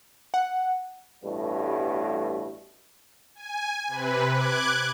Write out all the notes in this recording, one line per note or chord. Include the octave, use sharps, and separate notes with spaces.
F#5
A1 G2 B2 G3 A3
G#5
C3 B4
D6 F#6 G#6